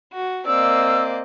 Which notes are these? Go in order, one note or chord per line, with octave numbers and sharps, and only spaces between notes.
F#4
A#3 C4 D5 D#5 E6